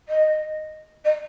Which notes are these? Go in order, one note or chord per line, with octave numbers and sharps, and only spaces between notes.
D#5
D#5